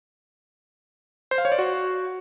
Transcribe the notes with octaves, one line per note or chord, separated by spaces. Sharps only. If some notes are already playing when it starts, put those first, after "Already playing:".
C5
F5
C#5
D5
F#4